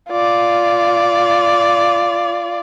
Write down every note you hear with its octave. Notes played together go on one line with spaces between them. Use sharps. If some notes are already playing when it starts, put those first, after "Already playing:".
F4 D5